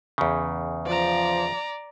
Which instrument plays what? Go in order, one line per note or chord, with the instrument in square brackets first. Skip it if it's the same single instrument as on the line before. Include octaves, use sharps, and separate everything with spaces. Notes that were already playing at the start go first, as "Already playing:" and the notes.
[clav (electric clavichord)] E2 C#3
[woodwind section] F3 [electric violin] D5 A#5